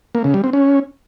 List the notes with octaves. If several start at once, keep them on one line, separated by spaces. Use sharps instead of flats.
A#3
C#3
G3
C4
C#4